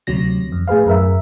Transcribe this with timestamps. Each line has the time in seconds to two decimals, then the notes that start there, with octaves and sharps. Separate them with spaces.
0.07 D2 C3 F#3 A#6
0.52 F2
0.68 A2 G#4 B4 F5
0.86 F#2 A#4 E5